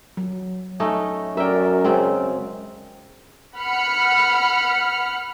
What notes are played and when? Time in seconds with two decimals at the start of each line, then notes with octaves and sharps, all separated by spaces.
0.17 F#3
0.80 A3 C#4 D#4
1.37 F#2 A#4 D5 E5 G5
1.84 C#3 G#3 C4
3.57 F#5 B5 F6 C#7